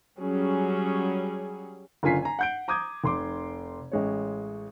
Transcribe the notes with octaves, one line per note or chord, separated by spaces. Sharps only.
F#3 G3 C#4 G#4
F#1 D3 F4 G#5 B6 C7
G#5 A#5
F#5 G6 D7
A#5 D6 D#6 G6 G#6
F1 C6 D6
A1 G#3 C#5